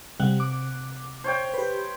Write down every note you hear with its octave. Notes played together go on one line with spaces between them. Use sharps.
C3 G3 F#5
D6
C5 C#5 G5
G4 B4